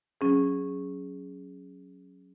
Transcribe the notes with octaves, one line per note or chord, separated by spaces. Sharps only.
F#3 C#4 G#4